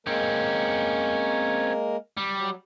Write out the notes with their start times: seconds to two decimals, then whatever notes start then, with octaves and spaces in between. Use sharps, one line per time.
0.07 G#3 A#3 C4 C#4 A#4
2.17 G3
2.37 F#3